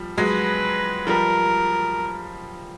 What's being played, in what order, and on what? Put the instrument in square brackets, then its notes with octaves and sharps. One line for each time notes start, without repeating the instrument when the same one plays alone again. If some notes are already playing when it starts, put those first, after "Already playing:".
Already playing: [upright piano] F3 G3
[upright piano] F#3 G#3 [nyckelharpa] B4
[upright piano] F3 G3 [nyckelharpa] A#4